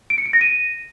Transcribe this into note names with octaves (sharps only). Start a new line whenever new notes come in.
D7
C#7
D7
A#6
D#7